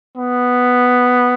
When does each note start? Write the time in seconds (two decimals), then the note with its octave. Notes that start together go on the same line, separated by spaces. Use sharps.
0.17 B3